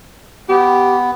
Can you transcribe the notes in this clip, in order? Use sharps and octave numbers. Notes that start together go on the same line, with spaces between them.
B3 G4